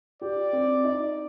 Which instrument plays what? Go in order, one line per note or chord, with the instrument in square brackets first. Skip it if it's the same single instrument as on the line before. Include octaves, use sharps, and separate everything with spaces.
[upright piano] G4 [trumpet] D5
[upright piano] C4
D#4